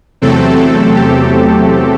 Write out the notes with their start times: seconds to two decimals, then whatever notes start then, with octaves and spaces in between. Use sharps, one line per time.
0.22 E2 C3 F#3 A3 C4 A4
0.96 G4